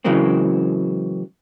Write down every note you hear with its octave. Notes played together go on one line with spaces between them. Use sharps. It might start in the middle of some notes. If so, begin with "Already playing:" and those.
C#3 E3 F#3 G#3 A#3 C4